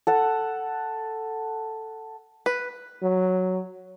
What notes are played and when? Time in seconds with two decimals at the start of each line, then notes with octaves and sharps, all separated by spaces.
0.07 A4 F#5
2.46 B4
3.03 F#3